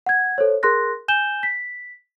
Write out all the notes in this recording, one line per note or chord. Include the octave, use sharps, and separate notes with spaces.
F#5 G#6
A4 C5 C#5
G#4 A#4 C6 F#6 A#6
G#5 G6 E7 G7
B6